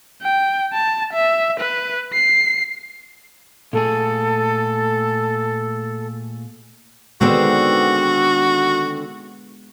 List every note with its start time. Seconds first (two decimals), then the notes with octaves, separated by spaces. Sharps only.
0.22 G5
0.73 A5
1.13 E5
1.59 B4
2.13 C7
3.73 A#2 A3 G#4 A4
7.21 D3 D#3 G#3 B3 C4 F#4